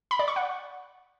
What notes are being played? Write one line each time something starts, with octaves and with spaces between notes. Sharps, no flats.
B5
D5
C#6
F#5